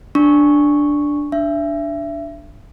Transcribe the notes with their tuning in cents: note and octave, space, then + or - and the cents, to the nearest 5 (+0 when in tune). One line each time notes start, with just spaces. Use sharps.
D4 +0 C#6 +0
D4 +0 E5 +25